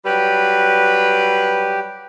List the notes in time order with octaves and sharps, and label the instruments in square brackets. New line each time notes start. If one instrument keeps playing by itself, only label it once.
[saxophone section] F#3 G3 B4 [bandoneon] G4